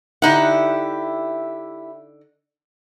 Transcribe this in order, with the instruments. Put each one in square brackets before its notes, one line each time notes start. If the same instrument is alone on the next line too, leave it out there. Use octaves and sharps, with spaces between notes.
[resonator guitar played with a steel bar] D3 D#4 F#5 [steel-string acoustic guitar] E4 G4